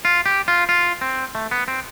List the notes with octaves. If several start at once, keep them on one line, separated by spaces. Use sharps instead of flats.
F4
G4
F4
F4
C4
A3
B3
C4